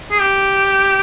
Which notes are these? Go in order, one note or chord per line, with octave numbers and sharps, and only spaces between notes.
G#4
G4